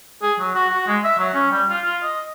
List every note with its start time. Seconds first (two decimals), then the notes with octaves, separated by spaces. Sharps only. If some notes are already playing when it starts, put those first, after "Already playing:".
0.22 G#4
0.40 F#3
0.55 F#4
0.70 F#4
0.87 G#3
1.04 E5
1.18 F#3
1.34 C#4
1.51 G3
1.69 F4
1.84 F4
2.03 D#5